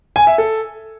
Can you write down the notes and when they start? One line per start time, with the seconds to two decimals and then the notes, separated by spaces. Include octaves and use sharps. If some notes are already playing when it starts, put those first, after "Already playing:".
0.16 G#5
0.27 E5
0.38 A4